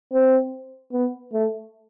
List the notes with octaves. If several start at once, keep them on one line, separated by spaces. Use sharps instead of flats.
C4
B3
A3